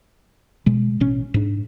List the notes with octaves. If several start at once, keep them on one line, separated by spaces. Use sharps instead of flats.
B2 G#3
A1 B2 C#4
G#2 D4